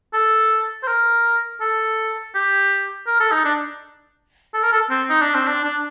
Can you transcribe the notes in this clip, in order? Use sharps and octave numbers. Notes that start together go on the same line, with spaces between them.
A4
C5
A#4
A4
G4
A#4
A4
D#4
D4
A4
A#4
A4
C4
D#4
D4
C4
D4
D4